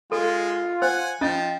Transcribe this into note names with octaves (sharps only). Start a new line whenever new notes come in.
G#3 F4 A4
C5 F#5 G#5
F3 C#4 D#5 G5 A6